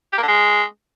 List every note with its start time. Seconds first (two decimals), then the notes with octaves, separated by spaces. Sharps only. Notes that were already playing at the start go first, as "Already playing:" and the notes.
0.13 G4
0.18 A#3
0.23 D3
0.28 G#3